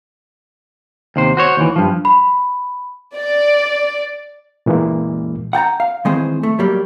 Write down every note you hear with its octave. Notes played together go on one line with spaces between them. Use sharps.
D#2 C3 C5
F#4 C5 C#5
D#2 E3
G2 F3
B5
D5
A#2 E3 G#3 A#3
F#5 G5 A5 A#5
F5
D#3 E3 G#3 C4 G#4 C5
A3
F#3 G3 A#3